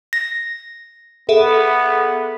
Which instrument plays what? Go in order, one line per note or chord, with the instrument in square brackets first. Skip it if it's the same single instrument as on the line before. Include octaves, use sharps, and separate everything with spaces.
[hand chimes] A#6
[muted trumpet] B3 [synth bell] G#4 A4 E5